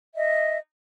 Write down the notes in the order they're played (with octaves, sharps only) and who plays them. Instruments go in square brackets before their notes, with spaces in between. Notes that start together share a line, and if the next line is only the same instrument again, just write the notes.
[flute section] D#5 E5